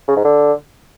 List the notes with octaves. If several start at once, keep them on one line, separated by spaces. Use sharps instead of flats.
C#3
G#2
D3